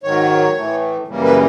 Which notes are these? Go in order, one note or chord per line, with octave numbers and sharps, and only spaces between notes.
G#2 D#3 F#3 C#5
A2 E3 A3
F#2 C#3 E3 G3 A#3
B4